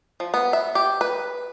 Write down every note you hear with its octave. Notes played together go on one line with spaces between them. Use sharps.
F3
B3
E5
G4
B4